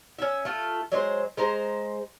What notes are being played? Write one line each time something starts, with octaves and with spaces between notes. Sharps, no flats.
C#4 E5
A3 F4
F#3 G#3 C5
G#3 C5 A#5